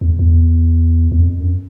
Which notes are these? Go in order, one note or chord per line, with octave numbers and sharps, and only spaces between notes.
E2
E2
E2
F2
F#2